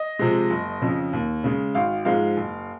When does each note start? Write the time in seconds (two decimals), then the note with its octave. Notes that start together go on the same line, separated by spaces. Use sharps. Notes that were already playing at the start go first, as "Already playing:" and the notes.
Already playing: D#5
0.19 C3 F3 G#3
0.50 F#1
0.82 F2 C#3
1.13 D#2
1.44 C#3 G#3
1.75 G#1 F5
2.05 G#2 F3 G#3 F5
2.37 F#1